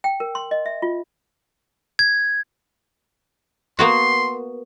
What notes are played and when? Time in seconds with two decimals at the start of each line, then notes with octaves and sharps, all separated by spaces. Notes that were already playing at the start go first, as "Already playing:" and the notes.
0.04 G5
0.20 A#4
0.35 C6
0.51 D#5
0.66 E5
0.82 F4
1.99 G#6
3.79 A#3 B3 F#4 C6